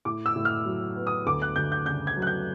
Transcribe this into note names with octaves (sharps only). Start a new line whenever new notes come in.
A2 D6
E6
A2
F6
F#3
B3
D#6
D2 D6
F#6
D2 G6
G6
C#3 G6
G#6
F#3
F#6
G6